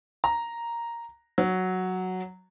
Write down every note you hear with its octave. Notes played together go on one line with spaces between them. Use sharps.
A#5
F#3